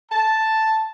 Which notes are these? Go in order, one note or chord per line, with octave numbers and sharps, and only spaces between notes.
A5